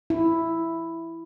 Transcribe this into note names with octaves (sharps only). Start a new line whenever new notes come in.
E4